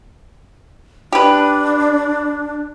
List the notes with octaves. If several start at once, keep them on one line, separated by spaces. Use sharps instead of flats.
D4 G4 B4